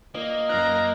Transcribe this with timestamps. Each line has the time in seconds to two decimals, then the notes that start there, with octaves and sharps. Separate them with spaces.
0.15 A#3 D#5
0.49 F#2 D#5 A#5 F6 F#6